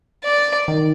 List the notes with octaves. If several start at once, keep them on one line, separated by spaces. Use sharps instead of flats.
D5
D#3